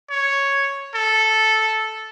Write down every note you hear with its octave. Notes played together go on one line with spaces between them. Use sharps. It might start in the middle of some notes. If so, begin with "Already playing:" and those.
C#5
A4